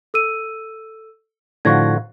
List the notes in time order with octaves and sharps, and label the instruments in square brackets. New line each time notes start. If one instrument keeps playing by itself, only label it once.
[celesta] A4 E6 D#7
[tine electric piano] A2 A#6 [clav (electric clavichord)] D3 F3 F#4 [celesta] F5 C#6 G#6